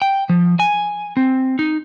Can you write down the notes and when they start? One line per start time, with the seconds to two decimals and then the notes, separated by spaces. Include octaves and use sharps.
0.02 G5
0.29 F3
0.60 G#5
1.17 C4
1.59 D#4